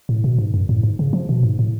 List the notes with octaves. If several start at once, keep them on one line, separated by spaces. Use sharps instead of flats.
A2
B2
G#2
F#2
A2
G#2
C#3
F3
B2
G#2
A2